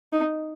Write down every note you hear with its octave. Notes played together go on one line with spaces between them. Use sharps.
D#4